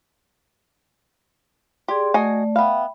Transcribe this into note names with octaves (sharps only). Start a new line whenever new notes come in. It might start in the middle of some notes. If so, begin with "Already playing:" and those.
G4 G#4 D5 C6
A3 F#4 D5 D#5 G#5
B3 E5 F5 G5 B5